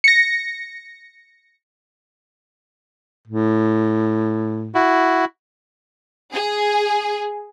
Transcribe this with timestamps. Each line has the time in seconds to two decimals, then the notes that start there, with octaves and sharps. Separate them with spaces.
0.04 A#6 C#7
3.28 A2
4.75 E4 F#4
6.33 G#4